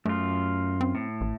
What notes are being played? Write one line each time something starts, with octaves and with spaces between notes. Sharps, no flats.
F#2 A3 F4
C4
A2
A1